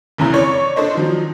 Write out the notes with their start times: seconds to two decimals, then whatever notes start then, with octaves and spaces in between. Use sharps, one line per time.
0.18 F1 E2 C#3 E4 A#5
0.34 C#5 D5
0.76 D4 A4 C5 D#5
0.95 D#3 F3 F#3